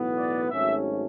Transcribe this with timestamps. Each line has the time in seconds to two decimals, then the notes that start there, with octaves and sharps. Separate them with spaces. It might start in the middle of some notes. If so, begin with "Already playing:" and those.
Already playing: B1 A2 E3 B3
0.17 D5
0.50 G#1 G#2 F#3 A3 C#4 E5